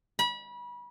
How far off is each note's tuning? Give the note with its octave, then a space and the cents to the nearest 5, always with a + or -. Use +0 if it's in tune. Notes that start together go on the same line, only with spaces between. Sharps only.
B5 -30